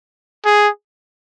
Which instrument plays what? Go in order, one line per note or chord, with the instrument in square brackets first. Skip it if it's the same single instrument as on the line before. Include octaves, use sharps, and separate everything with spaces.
[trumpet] G#4